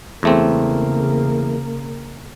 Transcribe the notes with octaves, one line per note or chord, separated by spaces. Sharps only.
E2 C#3 A3 A#3 C4